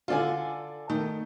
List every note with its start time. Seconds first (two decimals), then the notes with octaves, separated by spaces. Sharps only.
0.08 D3 F4 A4 D5 G#5
0.90 D#3 A3